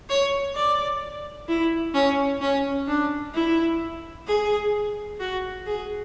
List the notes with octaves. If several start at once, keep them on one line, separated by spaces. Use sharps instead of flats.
C#5
D5
E4
C#4
C#4
D4
E4
G#4
F#4
G#4